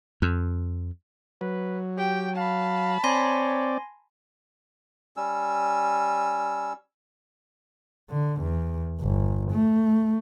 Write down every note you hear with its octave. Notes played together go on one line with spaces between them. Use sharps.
F2
F#3 B4
G4 G5
F5 A5 B5
C4 C#5 D5 G#5 C6 A#6
G3 C#4 E6
D3
E2
G1
A3